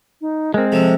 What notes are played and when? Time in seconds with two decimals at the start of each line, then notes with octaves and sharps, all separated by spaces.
0.21 D#4
0.54 G#3 C4 A#4
0.72 C3 F3 A4